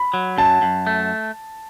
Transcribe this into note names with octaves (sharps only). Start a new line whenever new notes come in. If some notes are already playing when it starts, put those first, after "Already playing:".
Already playing: B5
F#3
F#2 A5
F#2
A3